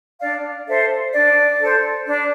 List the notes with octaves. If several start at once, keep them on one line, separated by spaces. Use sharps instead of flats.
D4 D5 F5
A4 C5 E5
D4 D5
A4 C5
D4